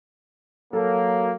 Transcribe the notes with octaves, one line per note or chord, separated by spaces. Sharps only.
F#3 A#3 A4